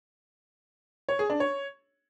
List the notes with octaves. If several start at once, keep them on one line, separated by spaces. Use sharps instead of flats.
C#5
G#4
D4
C#5